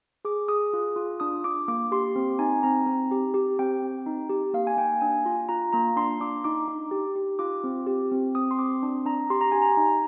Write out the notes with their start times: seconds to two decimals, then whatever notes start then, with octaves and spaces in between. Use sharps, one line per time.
0.25 G#4 D6
0.48 G#4 D#6
0.73 F4
0.96 F4
1.20 D4 D#6
1.44 D4 D6
1.68 A#3 D6
1.92 G4 C6
2.16 C4
2.39 D#4 G#5
2.63 C4 A#5
2.86 C4
3.11 G4
3.34 G4
3.59 C4 G5
3.82 C4
4.06 D#4
4.29 G4
4.54 A#3 F5
4.67 G#5
4.77 A#3 G5
5.01 D4 G#5
5.26 F4
5.49 F4 A#5
5.73 A#3 A#5
5.96 D4 C6
6.21 D4 D6
6.44 D#4 D6
6.68 D#4
6.91 G4
7.16 G4
7.39 F4 D6
7.64 C4
7.87 G4
8.11 C4
8.35 C4 D#6
8.51 C6
8.59 C4 D6
8.83 D4
9.06 D4 A#5
9.30 G4 C6
9.41 A#5
9.52 G4 G#5
9.62 A#5
9.77 D#4